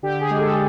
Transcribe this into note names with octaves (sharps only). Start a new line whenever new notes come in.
D3 G4
G#4
G#3
A4